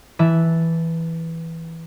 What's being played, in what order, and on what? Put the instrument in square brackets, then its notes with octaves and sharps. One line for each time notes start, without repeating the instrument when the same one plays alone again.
[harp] E3 E5 A5 F#6